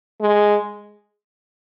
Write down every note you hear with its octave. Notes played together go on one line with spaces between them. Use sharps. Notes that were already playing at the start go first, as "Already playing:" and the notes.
G#3